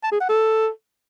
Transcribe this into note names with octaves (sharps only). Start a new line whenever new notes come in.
A5
G#4
F#5
A4